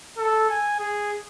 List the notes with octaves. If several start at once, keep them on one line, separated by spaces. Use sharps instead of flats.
A4
G#5
G#4